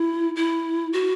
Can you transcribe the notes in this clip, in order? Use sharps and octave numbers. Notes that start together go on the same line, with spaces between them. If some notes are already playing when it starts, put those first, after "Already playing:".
Already playing: E4
E4
F#4